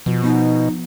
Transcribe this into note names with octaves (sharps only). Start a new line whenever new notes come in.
B2 F3
B3 D#4